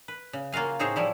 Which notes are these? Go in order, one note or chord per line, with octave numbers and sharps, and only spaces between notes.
B4
C#3
A#3 F4 F#4 F5 G#5
A2 C4 D#4 G#4 C5 C#5
A2 F3 G3 E4